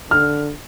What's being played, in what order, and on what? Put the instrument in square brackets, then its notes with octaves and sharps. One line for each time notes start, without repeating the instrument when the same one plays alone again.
[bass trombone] D3 [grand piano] F6